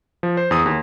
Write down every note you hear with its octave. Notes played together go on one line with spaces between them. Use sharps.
F3
C5
E2 D#6
D#2